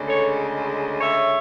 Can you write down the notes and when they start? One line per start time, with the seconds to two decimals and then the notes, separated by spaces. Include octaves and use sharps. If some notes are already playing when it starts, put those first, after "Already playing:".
Already playing: D2 C#3 G#3
0.08 A4 C#5
1.01 C#5 E5